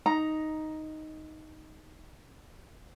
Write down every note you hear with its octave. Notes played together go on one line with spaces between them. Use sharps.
D#4 A#5